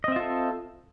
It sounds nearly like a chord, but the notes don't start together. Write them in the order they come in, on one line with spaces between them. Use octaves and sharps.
D#5 C4 E5 F4 A4